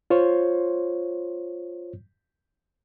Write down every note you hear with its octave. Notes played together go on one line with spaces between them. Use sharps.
F4 C5 C#5